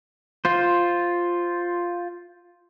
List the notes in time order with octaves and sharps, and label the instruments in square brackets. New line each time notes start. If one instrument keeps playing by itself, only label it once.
[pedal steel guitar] F4 C5